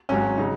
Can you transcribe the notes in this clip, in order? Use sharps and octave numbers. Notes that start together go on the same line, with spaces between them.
G#1 G#2 F#3 C#4
C#3 F#3 D#4